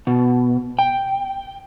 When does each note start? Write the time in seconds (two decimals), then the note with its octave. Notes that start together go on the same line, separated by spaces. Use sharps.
0.07 B2
0.79 G5